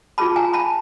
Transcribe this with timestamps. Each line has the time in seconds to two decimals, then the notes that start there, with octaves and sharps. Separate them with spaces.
0.18 F4 G#4 B4 A5 B5
0.36 G#5 A#5
0.53 A5 B5